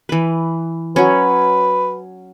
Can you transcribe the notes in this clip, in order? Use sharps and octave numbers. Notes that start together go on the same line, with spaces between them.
E3 B4
F#3 C#4 B4